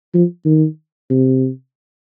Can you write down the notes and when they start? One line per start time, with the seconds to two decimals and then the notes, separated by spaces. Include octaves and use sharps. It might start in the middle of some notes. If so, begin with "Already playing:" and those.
0.14 F3
0.46 D#3
1.10 C3